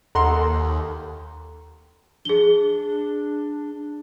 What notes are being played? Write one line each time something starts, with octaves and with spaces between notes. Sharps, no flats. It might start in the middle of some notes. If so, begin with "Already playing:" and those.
D#2 A4 F#5 A#5 C6
D4 G#4 G7